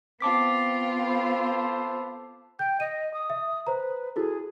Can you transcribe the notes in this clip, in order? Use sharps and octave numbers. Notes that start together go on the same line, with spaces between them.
B3 C4 F4 A5 D6 B6
A4 B4 C5
G5 G6
D#5 D#7
D#6
E5
B4 C5 A#5
E4 F#4 G#4 A4